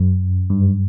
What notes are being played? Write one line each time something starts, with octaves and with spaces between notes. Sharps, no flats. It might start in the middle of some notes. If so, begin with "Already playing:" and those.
Already playing: F#2
G2